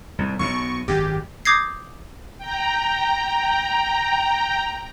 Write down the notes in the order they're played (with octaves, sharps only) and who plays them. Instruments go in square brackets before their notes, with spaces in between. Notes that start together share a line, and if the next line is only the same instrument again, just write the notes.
[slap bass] C2 G#2
[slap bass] B1 B2 [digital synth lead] C#6
[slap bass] G#1 F#2 [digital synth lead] G4
[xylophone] D6 D#6 G6 G#6 A#6 C7
[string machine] G5 A#5